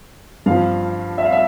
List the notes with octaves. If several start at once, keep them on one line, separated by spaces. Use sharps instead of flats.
G2 F3 F5
E5
F5
E5